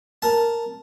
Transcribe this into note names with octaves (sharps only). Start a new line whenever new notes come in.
A#4 A5